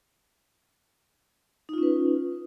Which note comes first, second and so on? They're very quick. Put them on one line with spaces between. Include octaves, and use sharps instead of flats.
D#4 F4 C#4 B4